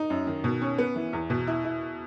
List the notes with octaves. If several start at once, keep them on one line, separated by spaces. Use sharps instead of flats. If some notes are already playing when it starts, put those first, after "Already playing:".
Already playing: D#4
F#2
D#3
B2
C#4
B3
E3
E2
B2
E4
E4